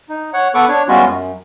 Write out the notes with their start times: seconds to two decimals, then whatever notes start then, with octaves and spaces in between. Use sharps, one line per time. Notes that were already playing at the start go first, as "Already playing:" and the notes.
0.09 D#4
0.33 C#5 F#5
0.54 B3 A4 B4 F#5 C#6 D6
0.69 D4 C#5
0.88 G3 G#3 B3 C#4 F4 F#4
1.07 F#2